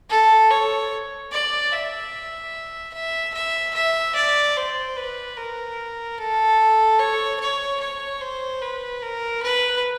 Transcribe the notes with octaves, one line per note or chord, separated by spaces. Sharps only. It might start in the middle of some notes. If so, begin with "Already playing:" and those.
A4
C#5
D5
E5
E5
E5
E5
D5
C5
B4
A#4
A4
C#5
C#5
C#5
C5
B4
A#4
B4